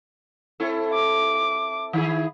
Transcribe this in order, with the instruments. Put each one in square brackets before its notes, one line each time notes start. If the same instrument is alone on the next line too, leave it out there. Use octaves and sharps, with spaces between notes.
[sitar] C4 E4 A4
[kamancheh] D6
[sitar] D#3 E4 G#4